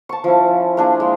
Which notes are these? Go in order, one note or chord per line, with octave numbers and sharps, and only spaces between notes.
A5 C#6
F3 C#4 E4
A#3 D4 G#4
G#3